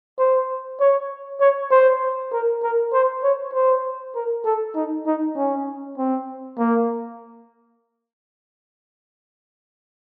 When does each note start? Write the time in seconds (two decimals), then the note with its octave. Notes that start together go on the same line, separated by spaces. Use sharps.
0.19 C5
0.80 C#5
1.40 C#5
1.71 C5
2.32 A#4
2.63 A#4
2.94 C5
3.23 C#5
3.53 C5
4.15 A#4
4.45 A4
4.75 D#4
5.07 D#4
5.36 C#4
5.97 C4
6.58 A#3